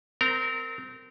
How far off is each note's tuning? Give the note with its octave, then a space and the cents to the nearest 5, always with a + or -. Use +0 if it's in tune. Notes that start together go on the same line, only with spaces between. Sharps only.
C4 -25 A#4 -15 A#5 +0